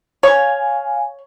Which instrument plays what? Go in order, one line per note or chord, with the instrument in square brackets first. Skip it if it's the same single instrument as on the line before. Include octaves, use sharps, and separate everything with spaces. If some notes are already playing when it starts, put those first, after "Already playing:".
[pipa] C#5 [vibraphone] F5 G#5